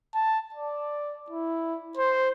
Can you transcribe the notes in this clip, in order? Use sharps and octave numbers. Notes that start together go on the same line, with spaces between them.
A5
D5
E4
C5